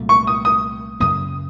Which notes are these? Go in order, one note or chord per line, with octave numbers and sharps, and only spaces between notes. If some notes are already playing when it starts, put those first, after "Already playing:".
Already playing: C2 A#2 F#3 A3
C#6
D#6
D#6
F#2 C#3 F#3 A#3 D#6